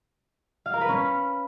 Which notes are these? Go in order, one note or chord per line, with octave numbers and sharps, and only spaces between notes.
F5
A#4
B4
C#4